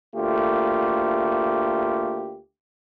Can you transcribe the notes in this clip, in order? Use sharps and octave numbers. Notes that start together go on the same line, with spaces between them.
D2 A3 A#3 F4 G4